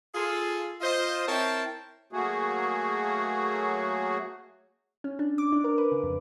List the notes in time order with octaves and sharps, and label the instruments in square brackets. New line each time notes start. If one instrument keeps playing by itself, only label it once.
[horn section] F4 G#4 A4
F4 C5 D#5
C4 E4 A#4 C#5 G5 A5
[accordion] F#3 A3 A#3 F#4 G#4
[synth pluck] C#4
D4
D6
D4
A#4
B4
C#3
F2